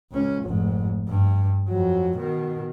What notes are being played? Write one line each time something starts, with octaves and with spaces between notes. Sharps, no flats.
C#2 C#4
F1 G#2
G2
F2 F#3
B2 D#3